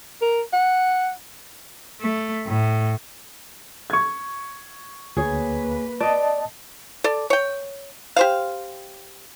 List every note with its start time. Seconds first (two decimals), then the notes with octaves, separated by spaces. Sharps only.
0.22 A#4
0.53 F#5
2.00 A3
2.47 A2
3.90 C#6 G#6
5.17 D2 A#3 G#4 B4 C#5
6.00 D5 D#5 A5
7.04 A4 D5
7.30 C#5 G5
8.16 G4 C5 F5